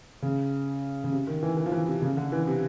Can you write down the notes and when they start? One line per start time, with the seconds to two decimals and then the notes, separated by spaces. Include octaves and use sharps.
0.22 C#3
1.04 C#3
1.12 C3
1.27 D#3
1.43 E3
1.57 E3
1.66 F3
1.72 E3
1.87 C3
2.02 C#3
2.17 D3
2.32 E3
2.47 C3